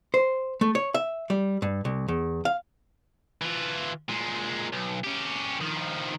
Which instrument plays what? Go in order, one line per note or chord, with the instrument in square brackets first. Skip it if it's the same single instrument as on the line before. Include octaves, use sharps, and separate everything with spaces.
[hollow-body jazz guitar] C5
A3
C#5
E5
G3
G2
C2
E2
F5
[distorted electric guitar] E3 F4
A#2 G#3
B1
C#4 G4
D#3 F3